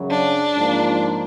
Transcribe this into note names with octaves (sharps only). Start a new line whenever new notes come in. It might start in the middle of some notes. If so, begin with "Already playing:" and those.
Already playing: F#2 C#3 F#3
D4
G#2 F3 A#3